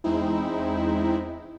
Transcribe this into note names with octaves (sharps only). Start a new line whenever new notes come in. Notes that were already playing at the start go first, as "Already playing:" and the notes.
E2 G#3 C4 D#4 E4